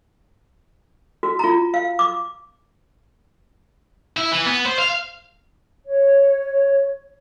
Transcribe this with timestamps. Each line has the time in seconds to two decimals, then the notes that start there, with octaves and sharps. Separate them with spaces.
1.23 F#4
1.39 F4 A#5
1.74 F5
1.99 D6
4.17 E4
4.32 E3
4.46 B3
4.66 C5
4.79 F5
5.86 C#5